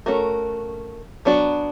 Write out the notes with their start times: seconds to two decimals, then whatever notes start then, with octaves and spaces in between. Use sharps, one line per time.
0.06 A3 C#4 F#4 A#4
1.25 F#3 B3 D4 F#4